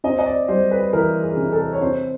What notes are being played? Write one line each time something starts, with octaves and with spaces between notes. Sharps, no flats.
C4 D#5
D#5
D5
G3 C5
B4
E3 A#4
G#4
C3
A4
C#5
C4 C5